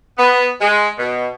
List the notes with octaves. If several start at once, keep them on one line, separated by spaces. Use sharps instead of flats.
B3
G#3
B2